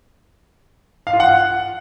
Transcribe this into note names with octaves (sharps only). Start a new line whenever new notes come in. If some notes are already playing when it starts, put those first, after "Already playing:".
F5
F4
F#5